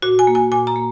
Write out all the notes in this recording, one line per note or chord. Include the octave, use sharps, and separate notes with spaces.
A#2 F#4
G#5
A#3
G#5
A#2 G#5
A#5
A#3